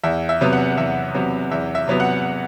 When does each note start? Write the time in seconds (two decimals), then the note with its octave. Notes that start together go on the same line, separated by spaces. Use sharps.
0.04 E2 E5
0.29 E5
0.41 C3 F#3 B3
0.53 F#5
0.77 E2 E5
1.15 C3 F#3 B3
1.51 E2 E5
1.75 E5
1.87 C3 F#3 B3
2.00 F#5